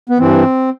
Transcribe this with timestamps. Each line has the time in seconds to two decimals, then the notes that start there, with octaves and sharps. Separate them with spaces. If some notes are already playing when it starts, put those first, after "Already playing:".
0.09 B3
0.18 G2 E3 C4